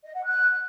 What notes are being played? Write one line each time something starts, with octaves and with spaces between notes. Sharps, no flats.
D#5
F#5
F#6